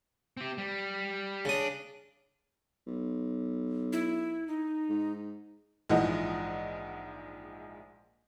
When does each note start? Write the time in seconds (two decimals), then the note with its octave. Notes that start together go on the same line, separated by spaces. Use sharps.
0.37 C4 G4
0.58 G3
1.45 C#3 D4 D#6
2.86 B1
3.93 E4
4.48 D#4
4.89 G#2
5.90 A#1 G#2 E3 F3 D#5 F#5